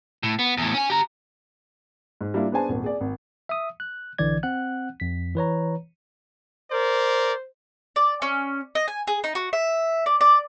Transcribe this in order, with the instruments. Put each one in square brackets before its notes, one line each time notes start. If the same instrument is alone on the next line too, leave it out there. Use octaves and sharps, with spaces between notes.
[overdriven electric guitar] A2
B3
E2 A2
C#4 G#5
G4 A#5
[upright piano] G#2
G3 A#3 D4 E4 F4
B3 D4 G#4 C5 G#5 A5
D#1 G#1
G#4 D5
G#1
[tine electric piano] E5 D#6
F#6
B1 D3 E3 D5 G#6
C4 F#5 F#6
F2 B6
E3 B4 C#5 A#5
[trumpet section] A#4 D5 [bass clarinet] C5
[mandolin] D5
C#4
D#5
G#5
G#4
D#4
F#4
E5
D5
D5